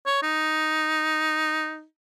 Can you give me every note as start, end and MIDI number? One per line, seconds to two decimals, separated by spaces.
0.07 0.19 73
0.23 1.84 63